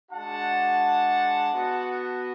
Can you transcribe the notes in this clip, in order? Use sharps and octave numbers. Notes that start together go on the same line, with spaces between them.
G#3 D4 F#4 F#5 A5
B3 F#4